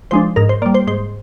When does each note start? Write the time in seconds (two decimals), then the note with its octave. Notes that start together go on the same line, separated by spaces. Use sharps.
0.11 F3 G#3 D4 C5
0.36 G#2 A#4
0.49 C5
0.62 A#3 D5
0.66 G3
0.74 C5
0.87 G#2 C5